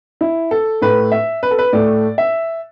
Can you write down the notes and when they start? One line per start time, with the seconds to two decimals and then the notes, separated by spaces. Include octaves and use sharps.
0.21 E4
0.51 A4
0.81 A2 A3 B4
1.12 E5
1.43 B4
1.51 A4
1.58 B4
1.73 A2 A3 D5
2.18 E5